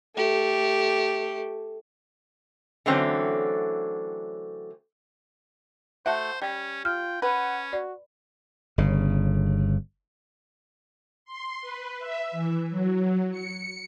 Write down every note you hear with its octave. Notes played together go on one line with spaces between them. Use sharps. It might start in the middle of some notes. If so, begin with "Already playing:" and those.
A3 G4
D3 E3 F#3 A3 C4 C#4
A3 F#4 C5 E5 F#5
G3 C#4
F4 G5 F6
C#4 B4 F#5
F#4 D5
G1 C#3
C6
B4
E5
E3
F#3
C#7